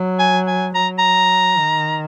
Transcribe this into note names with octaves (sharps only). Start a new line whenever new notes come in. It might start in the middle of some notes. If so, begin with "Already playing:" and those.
Already playing: F#3
G#5
G#5
F#3 A#5
A#5
D#3